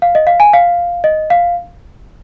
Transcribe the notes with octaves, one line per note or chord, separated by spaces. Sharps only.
F5
D#5
F5
G#5
F5
D#5
F5